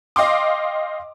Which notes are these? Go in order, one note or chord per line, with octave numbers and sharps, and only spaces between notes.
D#5 F5 G5 C6 D6